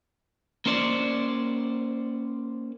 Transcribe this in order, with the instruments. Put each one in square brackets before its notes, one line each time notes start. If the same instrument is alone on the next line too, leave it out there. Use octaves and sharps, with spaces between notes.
[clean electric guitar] A#3 C#4 C5 D5